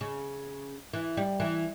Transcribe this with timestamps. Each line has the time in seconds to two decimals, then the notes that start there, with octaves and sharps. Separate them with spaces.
0.01 C#3
0.93 E3
1.17 G3
1.40 E3